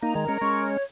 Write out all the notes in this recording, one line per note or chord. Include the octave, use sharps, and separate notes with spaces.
A#3 D#4 A#5
D#3 G#3
A#4
G#3 C#4
G#3 C#4 C#6
C#5